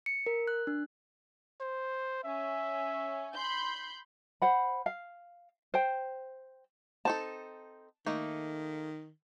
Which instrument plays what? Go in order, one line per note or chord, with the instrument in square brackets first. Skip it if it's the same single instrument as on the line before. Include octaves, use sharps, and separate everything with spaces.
[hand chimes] C#7
A#4
F#6
D4
[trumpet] C5
[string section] C#4 [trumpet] E5
[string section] B5 C6 G6
[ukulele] C5 F#5 B5
F5
C5 G5
[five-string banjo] C4 D#4 A4 [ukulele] A5
[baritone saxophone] D#3 [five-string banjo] A3 A#3 D#4